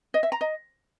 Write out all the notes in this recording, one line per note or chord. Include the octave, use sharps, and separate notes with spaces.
D#5
E5
A#5
D#5